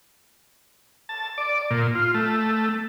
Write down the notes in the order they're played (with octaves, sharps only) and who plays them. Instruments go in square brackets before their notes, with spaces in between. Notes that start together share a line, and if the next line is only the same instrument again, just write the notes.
[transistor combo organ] A5
D5
A#2
F4
A3